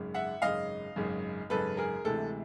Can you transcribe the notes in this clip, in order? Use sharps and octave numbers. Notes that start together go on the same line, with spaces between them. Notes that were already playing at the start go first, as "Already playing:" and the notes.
Already playing: G#1 F#2 C#3
E5 F#5
G#1 F#2 C#3 D#5 F5
G#1 F#2 C#3
G#1 F#2 C#3 A4 B4
G#4 A#4
D2 C3 E3 G#3 A4